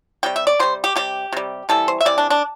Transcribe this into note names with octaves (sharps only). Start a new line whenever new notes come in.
C3 G3 G5
E5
D5
C3 G3 C5
G4
C3 G3 G4
C3 G3
C3 E3 G3 A4
C5
E5
C3 E3 D5
D4
D4